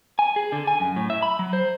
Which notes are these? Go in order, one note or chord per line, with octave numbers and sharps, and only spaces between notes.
G#5
G#4
D3
G#5
F#2
A2
E5
B5
F#3
C5